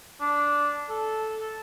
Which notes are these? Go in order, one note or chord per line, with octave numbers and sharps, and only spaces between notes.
D4
A4